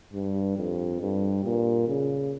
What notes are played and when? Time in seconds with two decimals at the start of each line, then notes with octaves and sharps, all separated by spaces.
0.13 G2
0.58 F2
1.01 G2
1.45 A#2
1.88 C#3